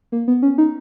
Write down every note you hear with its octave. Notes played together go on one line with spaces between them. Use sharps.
A#3
B3
C#4
D#4